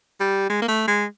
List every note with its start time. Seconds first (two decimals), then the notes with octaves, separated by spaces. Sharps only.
0.20 G3
0.50 G#3
0.62 A#3
0.68 A3
0.88 G#3